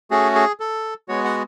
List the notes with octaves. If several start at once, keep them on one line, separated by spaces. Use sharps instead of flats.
A3 C#4 F#4 G#4
G#4
A4
G#3 B3 F#4 C#5
F#5